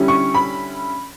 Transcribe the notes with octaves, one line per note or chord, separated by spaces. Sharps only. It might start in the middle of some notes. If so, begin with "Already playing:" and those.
Already playing: D3 G3 C#4 E4
C#6
B5